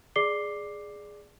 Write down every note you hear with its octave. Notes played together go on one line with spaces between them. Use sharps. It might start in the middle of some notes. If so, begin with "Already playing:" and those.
G#4 D5 D6 C7 G7